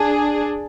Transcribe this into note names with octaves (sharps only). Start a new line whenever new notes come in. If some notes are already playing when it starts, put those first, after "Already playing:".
Already playing: D4 G#4